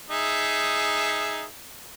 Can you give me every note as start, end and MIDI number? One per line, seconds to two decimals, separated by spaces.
0.10 1.45 63
0.10 1.45 68
0.10 1.45 76